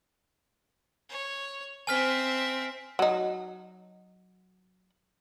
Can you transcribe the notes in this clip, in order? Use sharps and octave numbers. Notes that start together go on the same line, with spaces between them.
C#5
C4 E5 G#5 F6 B6
F#3 D#4